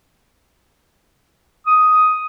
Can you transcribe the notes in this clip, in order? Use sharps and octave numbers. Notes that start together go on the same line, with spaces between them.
D#6